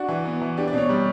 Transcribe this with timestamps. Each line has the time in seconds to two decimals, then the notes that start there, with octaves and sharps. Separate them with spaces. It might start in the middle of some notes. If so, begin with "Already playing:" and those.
Already playing: D4 F#4
0.08 E3
0.25 B3
0.41 E3
0.57 D4 G4
0.68 D5
0.73 B2
0.78 C#5
0.89 G3